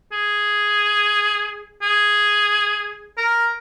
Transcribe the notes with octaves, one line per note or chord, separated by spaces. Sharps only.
G#4
G#4
A#4